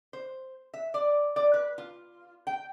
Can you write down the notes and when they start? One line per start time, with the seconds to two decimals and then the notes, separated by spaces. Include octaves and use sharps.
0.13 C5
0.74 E5
0.94 D5
1.36 D5
1.54 B4
1.78 F4
2.47 G5